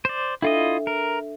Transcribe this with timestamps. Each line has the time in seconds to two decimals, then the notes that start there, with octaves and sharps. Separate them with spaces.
0.05 C5 D5
0.42 D4 E4 F4 A4 D#5 E5
0.87 A#4